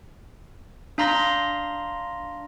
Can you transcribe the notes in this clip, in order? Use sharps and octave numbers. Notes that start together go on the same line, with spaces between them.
D4 F5 A#5 C6 A#6